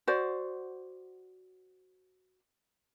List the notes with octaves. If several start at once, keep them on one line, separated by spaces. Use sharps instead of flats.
F#4 C5 D5